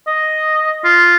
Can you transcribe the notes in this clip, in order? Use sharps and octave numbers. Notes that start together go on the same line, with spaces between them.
D#5
F4